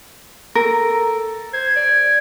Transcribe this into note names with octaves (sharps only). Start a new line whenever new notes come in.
A4 A#4
C5 G#6
D5